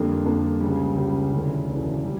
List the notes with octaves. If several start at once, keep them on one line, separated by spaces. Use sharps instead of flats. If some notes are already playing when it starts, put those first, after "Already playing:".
Already playing: F2 D3 G3 A#3 D4
F2 D3 G3 A#3 D4
C#2 C#3 G3
C#2 C#3 G3
E1 D2 C#3 E3
E1 D2 C#3 E3
G3